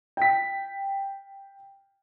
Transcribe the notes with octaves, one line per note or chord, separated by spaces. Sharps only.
G5 B6